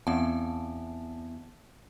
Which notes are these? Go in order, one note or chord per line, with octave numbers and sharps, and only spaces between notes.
E2 C4 A5